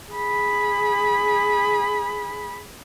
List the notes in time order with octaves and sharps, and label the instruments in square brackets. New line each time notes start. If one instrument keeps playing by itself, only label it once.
[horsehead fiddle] G#4 B5